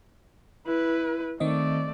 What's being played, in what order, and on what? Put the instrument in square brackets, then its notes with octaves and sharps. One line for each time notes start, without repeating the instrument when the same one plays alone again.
[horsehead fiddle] E4 B4
[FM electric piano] D#3 C4 D#5 [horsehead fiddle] A3 D5